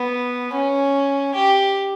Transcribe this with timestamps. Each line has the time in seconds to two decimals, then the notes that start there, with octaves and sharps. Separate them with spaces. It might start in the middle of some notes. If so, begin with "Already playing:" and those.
Already playing: B3
0.53 C#4
1.35 G4